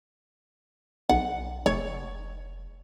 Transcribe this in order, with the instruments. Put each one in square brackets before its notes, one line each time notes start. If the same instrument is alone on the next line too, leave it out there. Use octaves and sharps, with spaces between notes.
[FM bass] B1 [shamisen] F#5
[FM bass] F1 [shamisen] C#5